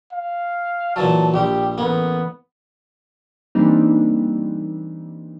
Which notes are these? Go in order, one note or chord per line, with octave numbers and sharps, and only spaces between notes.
F5
A#2 E3 F#3 A5
A#1 G3 G4
A1 A#3 B3
E3 G3 A#3 C4 D4 D#4